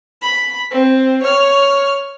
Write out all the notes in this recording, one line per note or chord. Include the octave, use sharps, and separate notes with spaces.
B5
C4
C#5 F6